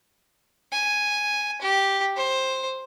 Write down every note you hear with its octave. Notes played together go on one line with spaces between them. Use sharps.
G#5
G4
C5